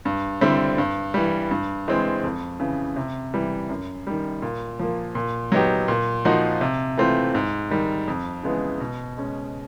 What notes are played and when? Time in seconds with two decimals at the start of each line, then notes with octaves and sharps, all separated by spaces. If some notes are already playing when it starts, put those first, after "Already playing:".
0.05 G2
0.41 D3 G3 C4 E4
0.78 G2
1.14 E3 G3
1.51 G2
1.88 E3 G#3 C4
2.23 F2
2.60 C#3 E3
2.96 C3
3.34 E3 G3
3.69 F#2
4.07 D#3 G3
4.42 A#2
4.80 F3 A#3
5.15 A#2
5.52 F#3 B3 D#4 G4
5.88 A#2
6.25 F3 A#3 D#4 F#4
6.61 C3
6.97 E3 A3 C4 F4
7.35 G#2
7.71 D#3 G3
8.08 F2
8.43 C#3 E3 G#3 B3
8.80 B2
9.17 G#3 C#4